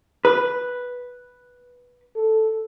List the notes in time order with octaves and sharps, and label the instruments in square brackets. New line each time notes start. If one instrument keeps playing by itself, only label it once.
[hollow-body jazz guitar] B4
[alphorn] A4